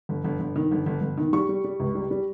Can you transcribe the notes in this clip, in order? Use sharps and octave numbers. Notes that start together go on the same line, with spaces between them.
G1
G1
G1
D#3
G1
G1
G1
D#3
G3 C#6
G3
G3
C#2
G3
G3